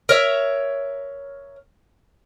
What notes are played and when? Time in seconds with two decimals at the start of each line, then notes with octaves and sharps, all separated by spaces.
0.09 A#4 C#5 E5